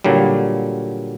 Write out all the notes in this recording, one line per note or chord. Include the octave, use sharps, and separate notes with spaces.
A#2 D3 F#3 G3